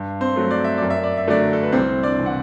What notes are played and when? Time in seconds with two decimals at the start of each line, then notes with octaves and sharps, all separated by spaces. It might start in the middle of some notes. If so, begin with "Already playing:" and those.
Already playing: G2
0.21 C4 C5
0.36 F#3 A3
0.51 D5
0.64 E5
0.78 F#2 D5
0.90 E5
1.04 D5
1.17 E5
1.27 D3 F#3 A3 D4 D5
1.53 A4
1.63 B4
1.72 C2 C4 C5
2.03 D4 D5
2.19 C3 E3
2.26 F#5